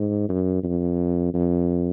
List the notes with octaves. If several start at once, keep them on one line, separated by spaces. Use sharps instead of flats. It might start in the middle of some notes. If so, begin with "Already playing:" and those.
Already playing: G#2
F#2
F2
F2